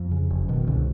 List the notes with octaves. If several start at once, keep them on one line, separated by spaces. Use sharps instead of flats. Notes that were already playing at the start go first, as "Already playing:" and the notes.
Already playing: F2
C#3
F#1
B2 D#3
C2 D3